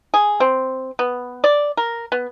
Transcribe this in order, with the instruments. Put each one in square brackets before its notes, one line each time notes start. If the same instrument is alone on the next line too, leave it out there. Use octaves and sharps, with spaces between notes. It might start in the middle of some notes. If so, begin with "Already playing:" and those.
[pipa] G#4
C4
B3
D5
A#4
B3